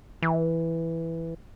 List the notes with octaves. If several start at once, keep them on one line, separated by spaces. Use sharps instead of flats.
E3